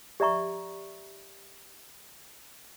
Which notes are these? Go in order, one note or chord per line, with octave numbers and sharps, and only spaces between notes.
G4 D5 E5 A#5 C#6